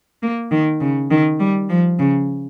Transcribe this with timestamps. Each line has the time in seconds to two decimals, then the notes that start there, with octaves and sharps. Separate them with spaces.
0.23 A#3
0.51 D#3
0.80 C#3
1.11 D#3
1.39 G3
1.69 F3
1.99 C#3